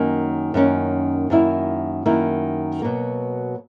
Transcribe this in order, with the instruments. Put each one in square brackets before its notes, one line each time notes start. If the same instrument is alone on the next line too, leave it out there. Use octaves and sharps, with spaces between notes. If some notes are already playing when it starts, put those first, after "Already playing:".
Already playing: [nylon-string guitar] F#2 D#3 A#3 C#4
F#2 D#3 A#3 C#4
F#2 D#3 A#3 E4
F#2 D#3 A#3 E4
B2 F#3 A#3